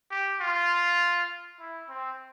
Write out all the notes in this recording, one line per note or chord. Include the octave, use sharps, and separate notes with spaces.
G4
F4
E4
C4